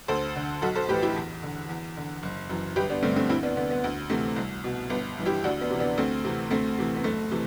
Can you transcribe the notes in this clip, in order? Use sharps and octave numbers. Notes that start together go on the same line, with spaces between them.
D2 A4 C5
D3
B1 F#4 A4
A4 C5
A2 E3 G4 B4
E4 G4
E2
D3
E2
D3
F#1
F#2 E3
G1 G4 B4
B3 D4
G2 D3 A3 C4
A3 C4
D2 C4 E4
B3 D4
D3 B3
B3
D2
C3 E3 A3 C4
C2
B2
G1 B3
G2 E3
E4 G4
D2 D4 F#4
B3 D4
C3 E3
B3 D4
D2 A3 C4
C3 E3
D2 A3 C4
C3 E3
B3
F#1 A3
C3 E3